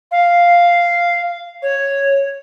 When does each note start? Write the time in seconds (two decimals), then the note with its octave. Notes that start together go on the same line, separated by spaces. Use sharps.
0.11 F5
1.62 C#5